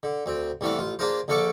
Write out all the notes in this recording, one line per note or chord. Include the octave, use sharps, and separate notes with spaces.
D3
D2 C4
C2 E3 A3 B3 D4 F5
A1 F4
A#3 D4 F4 G#4 A#4 C5
A#1 D3 A4 F5 C#6 D6